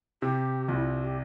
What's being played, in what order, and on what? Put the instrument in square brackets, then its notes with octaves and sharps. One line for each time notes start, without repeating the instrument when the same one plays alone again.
[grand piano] C3 [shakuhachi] G4
[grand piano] C2 [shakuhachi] F4
[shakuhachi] E4
F4
G4